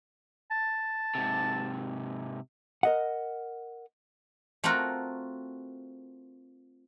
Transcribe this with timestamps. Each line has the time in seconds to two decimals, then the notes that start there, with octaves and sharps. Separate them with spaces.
0.51 A5
1.15 G#2 C3
2.83 A#4 D#5 F#5
4.64 A3 C4 F4 F#4 A#4